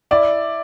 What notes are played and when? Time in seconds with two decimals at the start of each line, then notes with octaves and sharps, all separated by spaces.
0.11 E4 D5